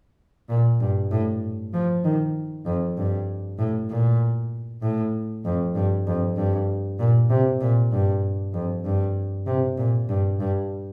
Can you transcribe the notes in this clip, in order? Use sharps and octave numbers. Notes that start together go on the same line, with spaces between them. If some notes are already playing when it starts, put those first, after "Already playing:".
A#2
G2
A2
F3
D#3
F2
G2
A2
A#2
A2
F2
G2
F2
G2
A#2
C3
A#2
G2
F2
G2
C3
A#2
G2
G2